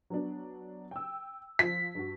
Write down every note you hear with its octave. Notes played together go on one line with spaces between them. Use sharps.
F#3 B3 D4
G5 E6
F3 F4 B6
G2 F#4